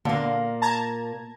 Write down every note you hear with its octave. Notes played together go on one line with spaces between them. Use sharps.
A#2 D3 A#3
A5 A#5 G#6